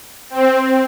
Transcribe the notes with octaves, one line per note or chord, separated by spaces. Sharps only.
C4